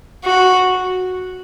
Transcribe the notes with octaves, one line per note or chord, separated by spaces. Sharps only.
F#4